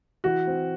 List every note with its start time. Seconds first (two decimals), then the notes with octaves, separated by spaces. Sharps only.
0.24 E3 F#4
0.47 C4